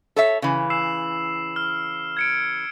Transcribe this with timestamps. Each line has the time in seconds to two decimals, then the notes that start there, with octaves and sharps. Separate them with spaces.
0.16 A4 C#5 E5
0.42 C#3 E3
0.70 E6 C7 E7
1.56 F6
2.17 G#6 C#7 D7